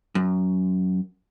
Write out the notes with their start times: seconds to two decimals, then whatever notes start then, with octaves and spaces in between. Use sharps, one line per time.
0.15 F#2